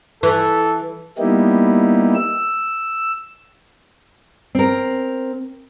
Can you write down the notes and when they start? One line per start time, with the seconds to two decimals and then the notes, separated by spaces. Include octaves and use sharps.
0.23 E3 A4
1.18 G3 A#3 B3 D#4 E4 G4
2.15 E6
4.55 C4 A#4